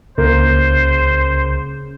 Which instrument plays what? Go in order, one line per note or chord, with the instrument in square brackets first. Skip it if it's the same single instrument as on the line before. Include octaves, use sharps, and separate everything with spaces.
[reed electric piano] C#2 [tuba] C#3 [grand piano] A#3 [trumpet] C5